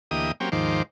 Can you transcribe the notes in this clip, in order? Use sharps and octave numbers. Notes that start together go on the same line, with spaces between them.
D2 E3 A#3 G4 D#5 D#6
F#3 A#3 C4 C#4 G4
D#2 G#2 D#3 F3 C5 D6